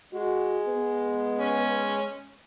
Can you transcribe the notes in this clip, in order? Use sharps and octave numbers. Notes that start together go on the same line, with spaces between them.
G#3 F#4
B3
C#4